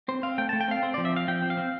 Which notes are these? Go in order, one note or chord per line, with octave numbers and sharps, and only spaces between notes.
C4 C5
C4 F5
A3 G5
A3 A5
G5
C4 F5
C4 C5
F3 D5
E5
C4 F5
F3 G5
C4
F5
C4